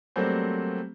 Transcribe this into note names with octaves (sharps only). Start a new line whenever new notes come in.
F#3 G3 A3 A#3 C4 C5